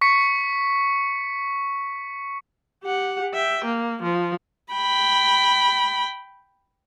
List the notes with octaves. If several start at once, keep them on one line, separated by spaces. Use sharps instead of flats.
C#6 B6 C#7
G4 F#5
E5 G5
A#3
F3
G5 B5